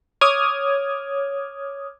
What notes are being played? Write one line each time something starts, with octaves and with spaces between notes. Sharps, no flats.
C#5 D6 D#6 F6 G#6